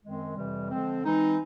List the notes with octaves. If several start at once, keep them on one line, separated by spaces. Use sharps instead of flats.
F#2 D#3 G#3 C4
F2 C3 E3 G3
D3 F3 G#3 C4
E3 G#3 C4 D#4